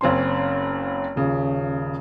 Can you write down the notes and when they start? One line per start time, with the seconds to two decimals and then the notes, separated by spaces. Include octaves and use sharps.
0.01 F#1 C4 C#4 C6
1.16 D#1 C#3